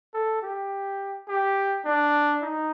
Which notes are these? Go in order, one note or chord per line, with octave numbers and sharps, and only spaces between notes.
A4
G4
G4
D4
D#4